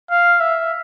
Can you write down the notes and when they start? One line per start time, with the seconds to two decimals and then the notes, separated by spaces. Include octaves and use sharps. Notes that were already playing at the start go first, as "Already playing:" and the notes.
0.11 F5
0.40 E5